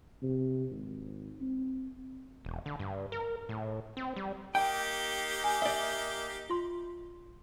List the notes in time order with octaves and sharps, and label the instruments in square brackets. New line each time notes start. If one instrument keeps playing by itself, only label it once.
[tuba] C3
G#1
C4
[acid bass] E1
D3
G2
A#4
A2
C4
G3
[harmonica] A#3 D#4 G4 [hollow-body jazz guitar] G5 [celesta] G6
[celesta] G#5
[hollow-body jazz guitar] D5 E5
[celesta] F4 C6